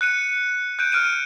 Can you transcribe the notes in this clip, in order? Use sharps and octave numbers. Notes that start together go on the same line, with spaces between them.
F#6 C#7 D#7
F#6 G6 D7 D#7
F6 F#6 D7 D#7